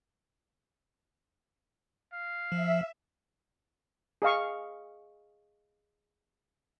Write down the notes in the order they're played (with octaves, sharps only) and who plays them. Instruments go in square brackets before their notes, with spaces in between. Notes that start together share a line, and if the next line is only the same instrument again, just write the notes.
[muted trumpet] F5
[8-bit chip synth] F3 [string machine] E5
[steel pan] G#4 D#5 F5 C#6